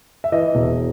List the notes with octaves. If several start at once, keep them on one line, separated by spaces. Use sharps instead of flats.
E5
E3 D#5
E1